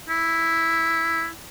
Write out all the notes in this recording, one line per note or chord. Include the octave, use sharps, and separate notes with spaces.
E4